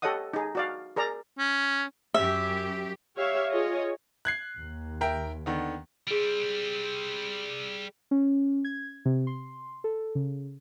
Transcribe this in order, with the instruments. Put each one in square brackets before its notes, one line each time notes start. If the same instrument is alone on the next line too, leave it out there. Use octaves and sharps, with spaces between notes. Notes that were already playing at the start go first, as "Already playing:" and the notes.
[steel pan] G4 A4 C#5 D#5 F#5 D#6
D#4 G#4
F#4 D5 F5
G#4 A#4 D5 A#5
[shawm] C#4
[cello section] F#2 G4 [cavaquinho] E5
[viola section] G4 C#5 E5 F5
F4 G#4 C#5 D#5
[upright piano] F#6 G#6 C7
[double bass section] D#2
[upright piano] A#4 E5 G5
D3 D#3 B3
[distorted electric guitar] G3 C4 [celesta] G#4 D7
[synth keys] C#4
G#6
C3
C6
A4
C#3